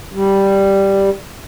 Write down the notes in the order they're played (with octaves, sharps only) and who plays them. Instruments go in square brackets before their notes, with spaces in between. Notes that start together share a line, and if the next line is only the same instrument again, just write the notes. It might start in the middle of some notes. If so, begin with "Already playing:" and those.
[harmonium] G3